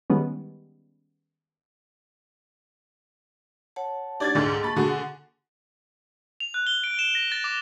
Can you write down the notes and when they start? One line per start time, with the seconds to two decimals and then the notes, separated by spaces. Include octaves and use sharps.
0.10 D#3 G3 G#3 B3 C#4
3.76 C#5 F#5 A5
4.20 D4 D#4 G4 D5 G#6 A6
4.35 C#2 G#2 D3 G#4
4.63 A#3 A5 B5 C#6 A6
4.76 D3 F#4 G#4
4.88 F#5
6.40 F7
6.54 F#6
6.67 G7
6.84 D7
6.99 E7
7.15 A#6
7.32 A6
7.44 D6